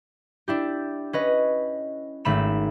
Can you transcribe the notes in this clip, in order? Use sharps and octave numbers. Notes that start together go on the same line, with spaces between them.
D4 E4 G4
C#4 B4 D#5
G#1 A3 B5 E7